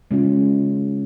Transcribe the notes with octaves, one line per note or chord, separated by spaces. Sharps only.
C#3 G#3 C#4 F4